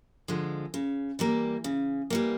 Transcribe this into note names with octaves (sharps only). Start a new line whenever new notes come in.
D3 F3 G#3
C#3
E3 G3 A#3
C#3
E3 G3 A#3